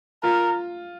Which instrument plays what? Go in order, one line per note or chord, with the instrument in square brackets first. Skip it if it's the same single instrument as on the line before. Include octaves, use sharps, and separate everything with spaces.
[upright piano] F4 [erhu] A#4